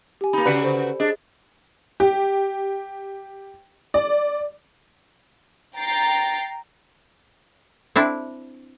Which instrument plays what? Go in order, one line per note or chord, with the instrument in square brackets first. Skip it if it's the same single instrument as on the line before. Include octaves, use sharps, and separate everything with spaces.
[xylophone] G4 G#5
[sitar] A#3 D#4 [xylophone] B5
[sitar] C#3 F#4 B4 [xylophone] D5 C#7
[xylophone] A4 C5
[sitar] D4 [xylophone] G#4 D#5
[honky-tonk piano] G4
D5
[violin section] G5 A#5 A6 C7
[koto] C4 D4 E4